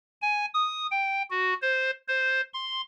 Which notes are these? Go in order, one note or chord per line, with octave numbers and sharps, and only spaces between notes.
G#5
D#6
G5
F#4
C5
C5
C6